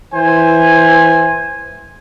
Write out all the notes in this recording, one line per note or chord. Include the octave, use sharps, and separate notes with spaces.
E3 C5 G#5